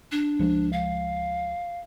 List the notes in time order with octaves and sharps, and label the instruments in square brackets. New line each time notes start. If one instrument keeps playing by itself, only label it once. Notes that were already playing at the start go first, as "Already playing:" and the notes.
[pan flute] D4
[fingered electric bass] C#2 F3 G#3
[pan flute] F5